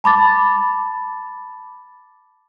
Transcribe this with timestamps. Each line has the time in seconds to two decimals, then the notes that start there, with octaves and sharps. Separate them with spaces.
0.04 A5 B5 D6 A6